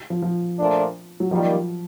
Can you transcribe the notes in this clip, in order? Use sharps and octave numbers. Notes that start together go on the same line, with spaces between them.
F3
F3
A#2 F3 A3 D4
F#3
D#3 F3 G3 A#3